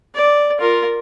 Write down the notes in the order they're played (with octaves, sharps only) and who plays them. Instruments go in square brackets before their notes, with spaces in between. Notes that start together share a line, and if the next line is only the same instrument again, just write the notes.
[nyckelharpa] D5
F4 A#4